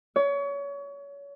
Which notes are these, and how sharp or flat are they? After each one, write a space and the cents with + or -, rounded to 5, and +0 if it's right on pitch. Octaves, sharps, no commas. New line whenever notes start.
C#5 +30